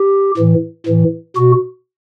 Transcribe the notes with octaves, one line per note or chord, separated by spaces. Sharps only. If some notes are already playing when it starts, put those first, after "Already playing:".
Already playing: G4
A2 E3
A2 E3
B2 F#4